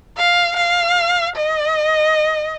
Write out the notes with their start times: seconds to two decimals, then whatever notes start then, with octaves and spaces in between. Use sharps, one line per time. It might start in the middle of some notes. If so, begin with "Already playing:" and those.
0.17 F5
0.57 F5
1.36 D#5